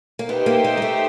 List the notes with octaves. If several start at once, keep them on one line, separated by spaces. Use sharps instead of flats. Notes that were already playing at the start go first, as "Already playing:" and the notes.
A#3
B3 D#4 G4 C5 E5 G5
A#3
A#3
G#3
A3